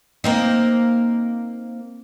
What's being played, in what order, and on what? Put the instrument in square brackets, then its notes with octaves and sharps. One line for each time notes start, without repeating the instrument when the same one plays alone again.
[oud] A#3 C4 D#4